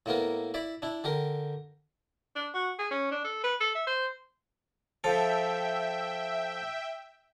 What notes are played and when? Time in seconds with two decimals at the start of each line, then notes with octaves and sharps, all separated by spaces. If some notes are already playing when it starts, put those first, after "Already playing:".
0.06 A2 A#3 B3 A#4
0.54 E4 D5 E5 B5
0.82 D4 E4
1.04 D3 G4 A#4
2.36 D4
2.54 F#4
2.79 G#4
2.91 C#4
3.11 D4
3.24 A4
3.43 B4
3.60 A4
3.75 E5
3.87 C5
5.04 F3 A4 E5 G5